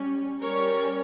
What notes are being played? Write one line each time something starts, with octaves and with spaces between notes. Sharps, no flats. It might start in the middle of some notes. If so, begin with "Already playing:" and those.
Already playing: G3 C#4
G3 C#4 A#4 C#5